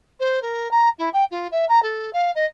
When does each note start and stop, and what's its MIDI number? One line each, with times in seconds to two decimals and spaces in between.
0.20 0.40 72
0.42 0.71 70
0.71 0.89 82
0.99 1.09 64
1.13 1.25 79
1.31 1.47 65
1.52 1.65 76
1.69 1.82 82
1.83 2.11 69
2.13 2.31 77
2.35 2.45 75